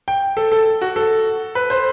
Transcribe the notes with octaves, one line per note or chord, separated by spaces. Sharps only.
G5
A4
A4
F#4
A4
B4
C5